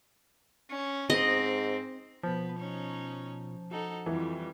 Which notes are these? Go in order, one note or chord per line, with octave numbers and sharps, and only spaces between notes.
C#4
G#2 C4 D#5
B2 F3 B3 F4 B4
C#4 D#4 C#5
D#4 F#4 A4 F#5
F2 E3 G3